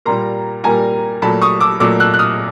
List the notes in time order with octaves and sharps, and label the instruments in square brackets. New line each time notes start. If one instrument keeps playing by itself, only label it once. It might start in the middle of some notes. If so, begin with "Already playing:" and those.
[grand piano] A#2 G3 A#3 A#5 C6
A#2 G3 A#3 G#5 A#5
A#2 F#3 A3 A5 B5
C#6 D#6
D6 E6
A#2 F#3 A3 D6 E6
E6 F#6
F#6
D#6 F6